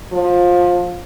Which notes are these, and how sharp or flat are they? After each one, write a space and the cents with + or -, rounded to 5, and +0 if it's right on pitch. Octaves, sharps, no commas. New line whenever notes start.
F3 +20